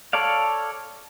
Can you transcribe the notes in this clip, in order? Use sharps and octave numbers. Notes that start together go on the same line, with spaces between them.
A4 C#5 D5 F5